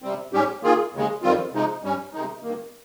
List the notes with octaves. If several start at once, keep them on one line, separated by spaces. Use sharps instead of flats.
C3 G3 C4
G#2 G3 C#4 G4
D#3 A#3 F4 G#4
D#2 C#3 G#3
F2 D#3 G3 C4 F4
C3 F3 G#3 D#4
G2 G3 C#4
C3 D#3 G#3 D#4
G2 D#3 A#3